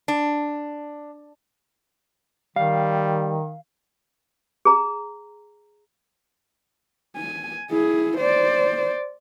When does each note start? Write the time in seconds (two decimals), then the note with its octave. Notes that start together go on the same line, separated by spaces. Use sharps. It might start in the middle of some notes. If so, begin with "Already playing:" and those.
0.08 D4
2.56 D#3 G3 F5
4.65 G#4 A#5
7.17 G#5
7.71 E4 G#4
8.18 C5 D5